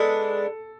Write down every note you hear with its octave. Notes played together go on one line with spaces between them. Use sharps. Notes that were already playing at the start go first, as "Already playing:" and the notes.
Already playing: G#3 B3 D4 A4